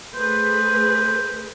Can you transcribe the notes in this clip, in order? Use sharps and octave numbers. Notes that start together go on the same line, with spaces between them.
A3 G#4 B4 C5